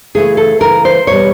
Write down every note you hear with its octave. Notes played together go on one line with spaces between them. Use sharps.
C#3 E3 A3 G#4
A4
C#3 E3 A3 A#4
C5
E2 B2 G3 C#5